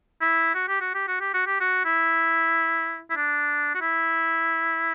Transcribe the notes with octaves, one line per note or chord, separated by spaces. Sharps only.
E4
F#4
G4
F#4
G4
F#4
G4
F#4
G4
F#4
E4
E4
D4
F#4
E4